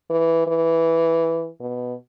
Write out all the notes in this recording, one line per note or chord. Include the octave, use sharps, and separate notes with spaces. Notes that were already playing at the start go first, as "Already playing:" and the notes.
E3
E3
B2